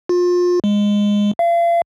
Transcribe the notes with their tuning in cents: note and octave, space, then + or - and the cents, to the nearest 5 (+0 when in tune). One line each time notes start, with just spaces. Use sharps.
F4 +30
G#3 -15
F5 -40